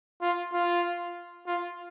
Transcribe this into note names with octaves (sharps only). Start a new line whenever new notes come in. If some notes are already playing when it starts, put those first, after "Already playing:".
F4
F4
F4